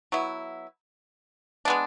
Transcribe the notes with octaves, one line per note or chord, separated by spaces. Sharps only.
F#3 B3 E4
G#3 B3 D4